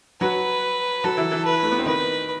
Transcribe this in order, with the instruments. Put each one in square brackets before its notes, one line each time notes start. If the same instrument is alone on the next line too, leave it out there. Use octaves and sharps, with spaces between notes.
[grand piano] F#3 F#4 [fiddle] B4
[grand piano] F#3 F#4 [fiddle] A4
[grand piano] E3 E4
E3 E4
[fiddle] B4
[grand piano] A3
B3
C4
[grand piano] D#3 D#4 [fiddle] B4